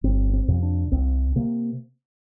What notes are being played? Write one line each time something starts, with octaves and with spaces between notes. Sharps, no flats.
G1 C4
C4
F2 C3
D4
C2 C4
C3 A#3